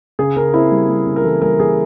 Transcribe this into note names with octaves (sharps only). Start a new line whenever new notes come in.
C#3 G#4
C#3 A#4
C4 E4
G3
G3
C#3
A#4
E3 A4
G3 A#4
E3 G#4